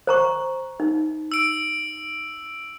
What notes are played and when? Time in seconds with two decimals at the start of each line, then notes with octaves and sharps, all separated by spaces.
0.07 C5 A#5 C#6
0.80 D#4
1.32 E6 D7